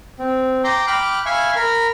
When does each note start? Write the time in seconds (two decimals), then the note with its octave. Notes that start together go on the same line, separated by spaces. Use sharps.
0.19 C4
0.64 G5 A#5 C6 D6
0.87 G5 B5 D6 F6 F#6
1.26 E5 F5 G#5 B5 C#6
1.56 A#4 B5 F6